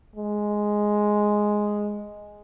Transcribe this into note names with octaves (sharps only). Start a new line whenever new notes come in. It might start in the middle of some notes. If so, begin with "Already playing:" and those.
G#3